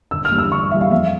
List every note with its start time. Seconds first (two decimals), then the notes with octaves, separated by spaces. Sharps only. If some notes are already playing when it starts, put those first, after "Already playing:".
0.11 G1 E6
0.25 F6
0.32 G2 E3 G3
0.38 E6
0.51 G1 C#6
0.71 G2 E3 G3 E5
0.81 F5
0.91 F2 E5